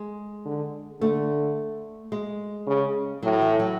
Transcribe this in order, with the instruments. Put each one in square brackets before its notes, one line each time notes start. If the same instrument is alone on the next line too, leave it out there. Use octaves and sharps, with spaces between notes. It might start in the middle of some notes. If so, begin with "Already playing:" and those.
Already playing: [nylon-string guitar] G#3
[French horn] D3
[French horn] D3 [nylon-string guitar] A3
[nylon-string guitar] G#3
[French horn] C#3
[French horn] A2 [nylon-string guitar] F#3
[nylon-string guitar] E3
F#3